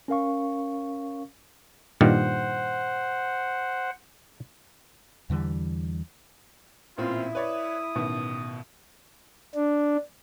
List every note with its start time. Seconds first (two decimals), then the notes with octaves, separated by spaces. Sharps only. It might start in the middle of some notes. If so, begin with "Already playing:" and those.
0.08 C#4 A#4 F5 C#6
2.01 G2 A#2 D#3 C5 F#5
5.30 E2 D3 E3 G3
6.98 A1 A#2 C4 E4 F4
7.35 B4 C#5 D5 D#6
7.95 A1 B2 D#3
9.55 D4